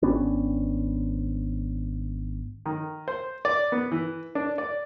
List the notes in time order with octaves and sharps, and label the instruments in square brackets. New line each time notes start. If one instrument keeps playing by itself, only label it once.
[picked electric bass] G#1 B3 C#4 D4
[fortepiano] D#3
C5
D5
B3
E3
D4
D5